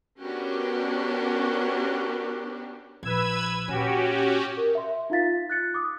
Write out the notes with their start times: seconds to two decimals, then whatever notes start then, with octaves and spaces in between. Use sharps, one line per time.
0.20 B3 C#4 D4 F#4 G4 A#4
3.03 A#1 B4 E6 G#6
3.68 A#2 C#4 F#4 G4
4.57 A#4
4.75 E5 C6
5.10 D#4 F4 F5 A6 B6
5.50 F#6 A6 C#7
5.74 D6 D#6